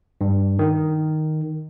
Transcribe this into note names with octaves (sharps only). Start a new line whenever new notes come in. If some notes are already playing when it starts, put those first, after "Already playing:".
G2
D#3